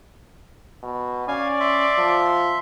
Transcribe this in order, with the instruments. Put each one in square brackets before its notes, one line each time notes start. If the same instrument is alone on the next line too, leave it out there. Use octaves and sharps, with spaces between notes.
[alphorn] B2
[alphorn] C#4 [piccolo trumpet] D5 [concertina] F5 G#5
[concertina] E5 C6
[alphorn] F3